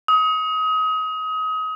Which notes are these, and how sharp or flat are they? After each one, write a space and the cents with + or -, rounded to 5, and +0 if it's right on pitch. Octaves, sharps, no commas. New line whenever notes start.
D#6 +30